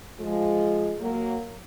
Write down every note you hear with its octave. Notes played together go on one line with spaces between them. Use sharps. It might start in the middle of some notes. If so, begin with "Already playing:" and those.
F3 G#3
F#3 A#3